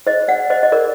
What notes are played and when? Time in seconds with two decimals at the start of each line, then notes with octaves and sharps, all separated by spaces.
0.07 C5 D#5
0.28 D5 F#5
0.50 C5 D#5
0.63 D#5
0.72 A#4 D5